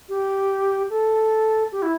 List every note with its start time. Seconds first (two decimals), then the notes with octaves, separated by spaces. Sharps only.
0.09 G4
0.90 A4
1.72 G4
1.82 E4